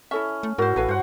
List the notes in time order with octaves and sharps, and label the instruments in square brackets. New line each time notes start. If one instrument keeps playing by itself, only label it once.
[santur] C#4 [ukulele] E4 A4 E5
[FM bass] A3
[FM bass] G#2 [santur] E4 F#4 [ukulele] A#4 C5
[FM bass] A1 [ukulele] A4 B4 F5 [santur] G#5
[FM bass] G2 [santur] C5 F#5